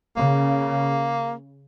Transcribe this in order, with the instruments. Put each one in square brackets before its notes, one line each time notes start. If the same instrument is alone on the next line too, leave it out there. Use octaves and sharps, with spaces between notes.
[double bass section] C#3 [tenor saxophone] A#3